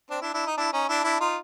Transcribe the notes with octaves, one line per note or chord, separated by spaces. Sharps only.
C4 D4
D4 E4
D4 E4
D#4
D4 E4
C#4 D#4
D4 E4
D4 E4
D#4 F4